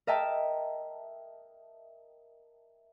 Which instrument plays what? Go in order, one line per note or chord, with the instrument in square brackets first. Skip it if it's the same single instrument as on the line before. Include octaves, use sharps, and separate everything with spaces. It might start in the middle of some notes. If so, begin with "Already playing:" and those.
[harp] A#4 D#5 E5 G5 A5